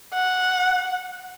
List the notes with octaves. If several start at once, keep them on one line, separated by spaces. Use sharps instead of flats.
F#5